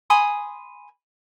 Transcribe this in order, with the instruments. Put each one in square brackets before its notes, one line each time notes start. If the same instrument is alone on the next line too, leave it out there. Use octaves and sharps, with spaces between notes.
[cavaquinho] G#5 B5 C6 D#6